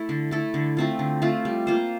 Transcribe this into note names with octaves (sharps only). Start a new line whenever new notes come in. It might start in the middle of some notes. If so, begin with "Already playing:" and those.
Already playing: A3 E4 A4
D3
A3 E4 A4
D3
A3 C4 F4
D3
A3 C4 F4
G3
A#3 F4 C5